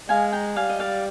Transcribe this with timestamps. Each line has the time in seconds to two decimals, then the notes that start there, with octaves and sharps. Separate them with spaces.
0.09 G#3 F5 G#5
0.32 G5 A#5
0.56 G3 F5 G#5
0.70 D#5
0.80 D5 F5